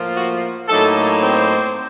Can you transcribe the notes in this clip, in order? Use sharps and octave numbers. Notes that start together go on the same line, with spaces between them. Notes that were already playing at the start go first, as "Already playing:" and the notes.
Already playing: A2 F3 A#3 F4
F#4
A2 F#3 A3 A#3 D#4 A4
C4 C5